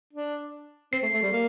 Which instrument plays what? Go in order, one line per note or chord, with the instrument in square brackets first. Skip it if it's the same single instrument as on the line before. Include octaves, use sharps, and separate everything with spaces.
[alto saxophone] D4
[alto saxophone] C4 [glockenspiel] C7
[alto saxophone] A3
A3
G3
A#3